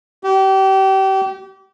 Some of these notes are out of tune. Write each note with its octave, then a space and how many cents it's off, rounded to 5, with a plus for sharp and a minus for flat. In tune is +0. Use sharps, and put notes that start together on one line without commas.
G4 -30